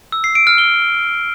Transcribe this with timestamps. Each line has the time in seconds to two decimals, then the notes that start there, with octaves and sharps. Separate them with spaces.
0.12 E6
0.24 C7
0.35 D7
0.47 F6
0.58 G7